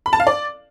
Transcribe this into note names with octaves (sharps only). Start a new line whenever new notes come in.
B5
A5
F5
D5